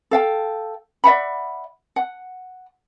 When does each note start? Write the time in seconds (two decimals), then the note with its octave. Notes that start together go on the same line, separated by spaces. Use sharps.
0.11 A4 F5 G5
1.04 D5 E5 F#5 B5
1.96 F#5